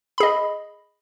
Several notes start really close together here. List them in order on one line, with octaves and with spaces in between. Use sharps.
B5 G#4 D#5